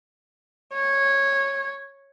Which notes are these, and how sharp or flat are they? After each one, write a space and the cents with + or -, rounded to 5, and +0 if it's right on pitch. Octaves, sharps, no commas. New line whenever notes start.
C#5 -10